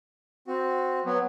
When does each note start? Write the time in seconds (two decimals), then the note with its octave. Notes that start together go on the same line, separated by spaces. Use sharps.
0.48 C4 F#4
1.05 F#3 B3